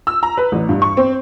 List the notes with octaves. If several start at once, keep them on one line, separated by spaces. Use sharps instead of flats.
E6
A#5
B4
A1
G2
C#6
C4